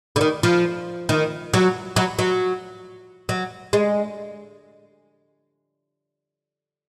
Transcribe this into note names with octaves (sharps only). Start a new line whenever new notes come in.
D3
D#3
F3
D#3
F#3
F#3
F#3
F#3
G#3